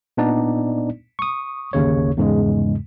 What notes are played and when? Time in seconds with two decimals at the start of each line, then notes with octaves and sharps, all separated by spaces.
0.17 A#2 B3 D4 D#4 D5
1.19 C#6 D#6
1.73 G1 D#2 C#3 C#5
2.17 E2 G#2 C#3 G#3